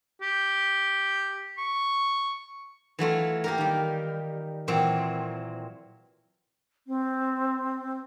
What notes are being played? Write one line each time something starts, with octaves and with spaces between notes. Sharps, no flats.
G4
C#6
E3 F#3 A3 F4
A#3 G4 A#4
D#3 G3
A#2 E3 F#3 C4
C4